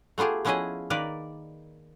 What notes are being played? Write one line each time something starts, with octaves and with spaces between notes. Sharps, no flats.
A3 B3 F4 G4 G#4
F3 B3 C#4 E4 G#4 D#5
D#3 A#3 A#4 B4 D5